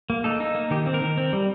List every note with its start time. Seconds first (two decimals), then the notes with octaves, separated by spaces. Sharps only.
0.10 A#3
0.24 D#4 A4
0.40 D#4
0.55 A#3
0.71 D#3 G4
0.87 C4
0.94 A#4
1.01 D#3
1.17 C4
1.33 G3